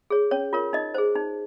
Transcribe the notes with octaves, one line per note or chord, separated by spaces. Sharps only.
G#4 C#5
C#4 C#5
F4 A#4 C#5
D#4 D#5
G#4 C5
D#4